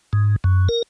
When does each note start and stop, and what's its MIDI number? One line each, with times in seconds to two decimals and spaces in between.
0.13 0.36 44
0.44 0.68 42
0.69 0.82 70